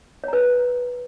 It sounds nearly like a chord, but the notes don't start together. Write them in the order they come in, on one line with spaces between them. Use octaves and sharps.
C#5 A#5 B4